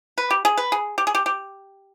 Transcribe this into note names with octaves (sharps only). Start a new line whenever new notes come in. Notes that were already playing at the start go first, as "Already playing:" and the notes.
B4
G4
G#4
B4
G#4
G4
G#4
G4
G4